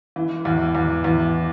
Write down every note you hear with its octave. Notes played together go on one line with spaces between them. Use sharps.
E3
E2
E2
E2